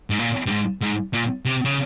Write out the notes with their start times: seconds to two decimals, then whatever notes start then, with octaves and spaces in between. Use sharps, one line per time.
0.10 G#2
0.19 A#2
0.46 G2
0.50 G#2
0.81 G#2
1.13 A#2
1.45 C3
1.65 C#3